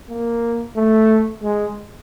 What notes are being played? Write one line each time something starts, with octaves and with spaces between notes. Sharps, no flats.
A#3
A3
G#3